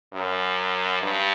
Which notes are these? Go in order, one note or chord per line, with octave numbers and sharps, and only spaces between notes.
F#2
G2